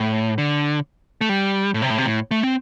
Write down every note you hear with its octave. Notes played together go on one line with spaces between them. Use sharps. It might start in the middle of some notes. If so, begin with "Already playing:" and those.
Already playing: A2
D3
A3
G3
A2
C3
A2
C3
A2
A3
C4